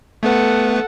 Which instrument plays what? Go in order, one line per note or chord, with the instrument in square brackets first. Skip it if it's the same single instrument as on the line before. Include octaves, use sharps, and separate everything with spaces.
[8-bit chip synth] A3 B3 B4 [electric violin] A4 F#5